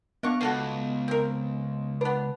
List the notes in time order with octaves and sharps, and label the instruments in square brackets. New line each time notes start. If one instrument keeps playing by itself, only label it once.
[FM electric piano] B3 [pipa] D4 F5 C#6
[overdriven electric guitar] C#2 [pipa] F#4 A4 F5
[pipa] C4 A#4
[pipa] B3 D4 [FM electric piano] B4